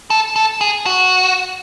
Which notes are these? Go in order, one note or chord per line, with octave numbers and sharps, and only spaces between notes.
A4
A4
G#4
F#4